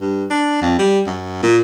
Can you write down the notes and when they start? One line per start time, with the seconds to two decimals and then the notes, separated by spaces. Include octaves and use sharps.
0.01 G2
0.30 D4
0.62 F2
0.79 G3
1.07 F#2
1.43 A#2